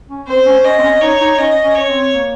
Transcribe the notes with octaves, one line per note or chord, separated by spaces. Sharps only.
C#4
C4 C5
C4
C#4
C#4 D#5
C4
C#4
D#4 C#5
D#4
C#4 D#5
C#4
C#5
C4
A#3